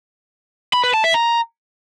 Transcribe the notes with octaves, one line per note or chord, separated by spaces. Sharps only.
B5
B4
A5
E5
A#5